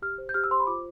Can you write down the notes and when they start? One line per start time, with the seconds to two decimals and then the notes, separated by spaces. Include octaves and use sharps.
0.02 G4 F6
0.18 C5
0.29 G6
0.34 G4 F6
0.44 E6
0.51 C5 C6
0.60 B5
0.67 F4 D6